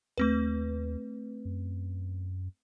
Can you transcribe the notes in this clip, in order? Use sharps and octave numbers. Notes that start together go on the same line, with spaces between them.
D#2 A3 C4 B4
F#2